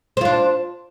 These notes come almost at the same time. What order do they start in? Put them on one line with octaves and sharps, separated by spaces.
C5 F4 D4